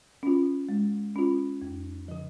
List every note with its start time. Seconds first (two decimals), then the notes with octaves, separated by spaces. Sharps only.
0.23 C#4 F4
0.69 G#3
1.16 C#4 F4
1.62 F2
2.08 C#3 F3